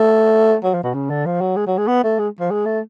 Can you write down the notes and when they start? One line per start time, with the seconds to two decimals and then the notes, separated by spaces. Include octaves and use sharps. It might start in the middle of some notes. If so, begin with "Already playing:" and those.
Already playing: A3
0.64 F#3
0.74 F3
0.84 B2
0.94 C#3
1.10 D3
1.26 F3
1.41 F#3
1.57 G#3
1.67 F#3
1.78 G#3
1.88 B3
2.04 A3
2.19 G#3
2.40 F3
2.51 G#3
2.66 A3